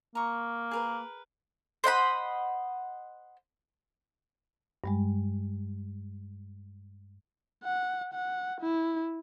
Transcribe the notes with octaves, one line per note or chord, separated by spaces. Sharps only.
A#3 A#5 C#6
G#4 A#4 B4
C5 D#5 F#5 B5
G2 G3 G#3
F#5
F#5
E4